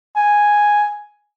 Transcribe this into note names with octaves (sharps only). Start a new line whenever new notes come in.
G#5